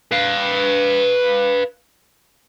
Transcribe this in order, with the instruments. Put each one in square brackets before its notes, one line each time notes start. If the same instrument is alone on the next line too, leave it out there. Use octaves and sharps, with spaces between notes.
[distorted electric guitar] B4 F5